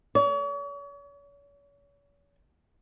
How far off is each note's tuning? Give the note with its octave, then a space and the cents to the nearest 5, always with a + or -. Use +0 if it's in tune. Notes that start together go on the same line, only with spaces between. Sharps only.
C#5 +40